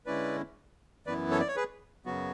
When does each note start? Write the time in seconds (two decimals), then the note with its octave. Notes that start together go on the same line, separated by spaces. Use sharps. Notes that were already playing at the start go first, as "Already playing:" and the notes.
0.06 D3 G#3 C#4 E4 B4 D5
1.06 F#2 E3 B3 E4 B4 D5
1.31 A4 C#5
1.40 D5
1.48 C#5
1.56 G#4 B4
2.05 F#2 C#3 F#3 B3 F#4